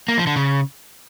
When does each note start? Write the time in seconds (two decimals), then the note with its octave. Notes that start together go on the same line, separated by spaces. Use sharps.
0.08 A#3
0.18 F3
0.27 D3
0.36 C#3